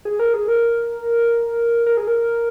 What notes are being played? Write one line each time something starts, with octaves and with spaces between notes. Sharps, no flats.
G#4
A#4
G#4
A#4
A#4
G#4
A#4